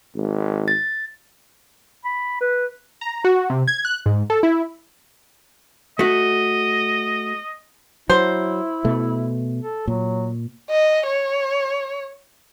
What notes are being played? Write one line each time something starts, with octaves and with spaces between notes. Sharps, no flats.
G#1
A6
B5
B4
A#5
F#4
C3
G#6
F#6
G#2
A4
E4
A3 F#4 D#5
F#3 E4 C5
B2 A3
A4
A#2 F#3
D#5
C#5